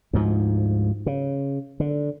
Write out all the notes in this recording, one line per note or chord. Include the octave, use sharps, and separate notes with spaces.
D2 G#2 F3
C#3
D3